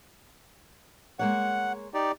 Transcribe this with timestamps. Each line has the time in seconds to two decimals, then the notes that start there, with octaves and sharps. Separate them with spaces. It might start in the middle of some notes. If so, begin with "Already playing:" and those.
1.19 G#3 A#3 C#5 F#5
1.94 D#4 G4 D5